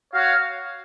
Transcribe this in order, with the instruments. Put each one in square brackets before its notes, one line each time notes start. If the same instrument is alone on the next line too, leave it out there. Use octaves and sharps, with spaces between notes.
[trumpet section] F#4 C#5 F5